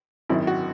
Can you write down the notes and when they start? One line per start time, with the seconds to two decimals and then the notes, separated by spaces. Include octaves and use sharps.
0.29 G#1 F#2 D#3 E4
0.47 F#4